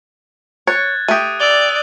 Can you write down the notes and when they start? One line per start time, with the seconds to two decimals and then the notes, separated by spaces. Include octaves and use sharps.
0.67 C#5 F#6 G#6 A6
1.08 A3 G4 D#6 D#7
1.40 D5 E6 F7 G7